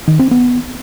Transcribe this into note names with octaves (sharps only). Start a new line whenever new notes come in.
D#3
C4
B3